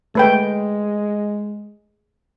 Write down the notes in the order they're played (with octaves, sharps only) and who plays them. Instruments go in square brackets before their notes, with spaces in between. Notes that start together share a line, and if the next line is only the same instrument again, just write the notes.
[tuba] G#3 [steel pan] A3 B4 G5